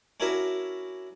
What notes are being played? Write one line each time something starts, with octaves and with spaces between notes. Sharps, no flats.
C#4 D4 E4 F#4 A#4 E5